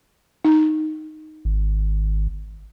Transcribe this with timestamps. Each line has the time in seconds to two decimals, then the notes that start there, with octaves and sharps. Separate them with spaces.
0.45 D#4
1.45 G#1